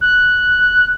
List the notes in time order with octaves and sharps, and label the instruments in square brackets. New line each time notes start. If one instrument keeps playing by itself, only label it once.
[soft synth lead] F#6